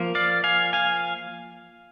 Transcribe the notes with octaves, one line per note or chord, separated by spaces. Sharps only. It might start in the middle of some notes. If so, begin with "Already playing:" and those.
Already playing: F3 A#3
D5 F5
F5 G#5
F5 G#5